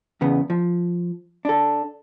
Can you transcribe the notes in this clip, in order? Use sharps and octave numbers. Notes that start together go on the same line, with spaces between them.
E2 C#3 B3
F3
D4 A4